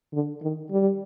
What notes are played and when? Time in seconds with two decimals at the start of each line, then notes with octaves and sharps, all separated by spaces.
0.13 D3
0.42 D#3
0.71 G3